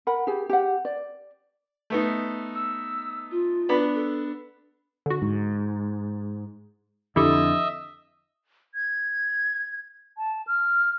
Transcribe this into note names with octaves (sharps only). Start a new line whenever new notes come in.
A#4 F#5 B5
G4 G#4
G4 F#5
D5
A3 B3 D#4
E6
F4
B3 D4 B5
A4
D3 F#4
G#2
F2 D3 E4 G4 A4 D#5 E5
G#6
A5
F6